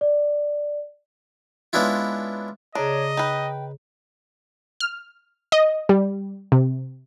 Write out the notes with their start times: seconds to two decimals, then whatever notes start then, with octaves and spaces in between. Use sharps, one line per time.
0.01 D5
1.73 G#3 B3 C#4 D4 E4 F4
2.75 C#3 D4 G#4 C#5 D#5 A#5
3.17 D#4 B4 G5
4.80 F6
5.52 D#5
5.89 G3
6.52 C3